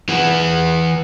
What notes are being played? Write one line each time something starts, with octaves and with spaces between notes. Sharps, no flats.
E3 B3